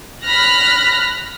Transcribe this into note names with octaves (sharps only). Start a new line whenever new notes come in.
B5 F6 F#6 A#6